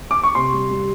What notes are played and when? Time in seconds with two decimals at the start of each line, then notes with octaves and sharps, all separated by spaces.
0.11 D6
0.23 C#6
0.35 C3 C6
0.53 G3
0.71 G3